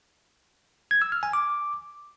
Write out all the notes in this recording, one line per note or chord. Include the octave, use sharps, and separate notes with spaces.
G#6
E6
F6
G#5
D6